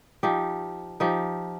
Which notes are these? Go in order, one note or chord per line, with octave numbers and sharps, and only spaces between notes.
F3 D#4 G4
F3 D#4 G4